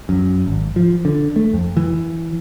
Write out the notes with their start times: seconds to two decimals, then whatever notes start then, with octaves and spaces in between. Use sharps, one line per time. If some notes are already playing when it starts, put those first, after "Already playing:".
0.09 F#2
0.46 G#1
0.76 F3
1.05 D3
1.36 A3
1.53 F2
1.77 E3